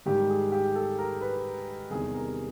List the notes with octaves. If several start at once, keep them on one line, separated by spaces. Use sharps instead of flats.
G#2 D#3 G3 G4
G#4
G4
A4
A#4
B4
E2 C3 D#3 G3 G#4
A#4